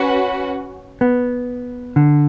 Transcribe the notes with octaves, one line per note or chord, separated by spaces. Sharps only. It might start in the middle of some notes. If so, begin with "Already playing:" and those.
Already playing: C#4 F#4 B4 F#5
B3
D3